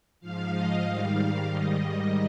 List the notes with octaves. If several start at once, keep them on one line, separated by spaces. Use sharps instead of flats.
G#2 F3 F5
D#5
G#2 D#3 G3 F5
G#2 D#3 G3 D#5